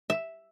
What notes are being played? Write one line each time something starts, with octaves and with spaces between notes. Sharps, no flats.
E5